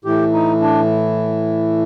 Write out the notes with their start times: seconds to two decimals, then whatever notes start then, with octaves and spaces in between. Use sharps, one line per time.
0.05 A2 E3 G4
0.33 D#4
0.61 D4